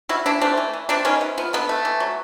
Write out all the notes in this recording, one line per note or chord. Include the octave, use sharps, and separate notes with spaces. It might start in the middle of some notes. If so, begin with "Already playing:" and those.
G3 E4 F#4
E3 D4 E4
A3 C4 D4
E3
E3
C3 C4 D4
D#3 B3 C#4
C3
F3 B3
D3 B3
A3
E3
F#3